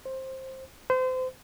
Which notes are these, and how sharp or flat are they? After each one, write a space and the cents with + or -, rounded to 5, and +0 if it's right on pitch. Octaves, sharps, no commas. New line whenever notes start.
C5 +15
C5 -30